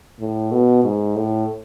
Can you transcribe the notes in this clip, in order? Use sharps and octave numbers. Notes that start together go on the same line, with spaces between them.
A2
B2
G#2
A2